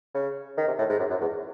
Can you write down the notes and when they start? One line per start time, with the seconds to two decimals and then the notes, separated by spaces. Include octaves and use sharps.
0.15 C#3
0.58 D#3
0.67 C3
0.79 A2
0.89 G#2
0.99 F#2
1.10 F#2
1.21 E2